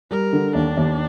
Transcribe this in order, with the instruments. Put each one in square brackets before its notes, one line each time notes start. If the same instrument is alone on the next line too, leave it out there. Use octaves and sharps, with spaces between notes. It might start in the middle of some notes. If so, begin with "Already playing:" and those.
[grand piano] G3 [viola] A#4
[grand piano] D3
[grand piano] D#2 [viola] D4
[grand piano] D#2